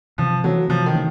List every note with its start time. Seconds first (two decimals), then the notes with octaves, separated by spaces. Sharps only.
0.18 C3 F3
0.44 E3 F#3 A3 C#4
0.69 C3 F3
0.86 D#3
0.94 E3 A3 C#4